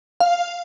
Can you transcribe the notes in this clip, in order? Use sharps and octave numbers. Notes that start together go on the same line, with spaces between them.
F5